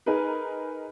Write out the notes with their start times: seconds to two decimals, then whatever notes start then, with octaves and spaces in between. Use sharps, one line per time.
0.06 D#4 G#4 A#4 B4